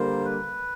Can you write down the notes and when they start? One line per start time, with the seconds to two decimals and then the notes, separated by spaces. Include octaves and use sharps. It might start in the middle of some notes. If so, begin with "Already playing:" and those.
Already playing: D3 G3 A#3 C5
0.25 B4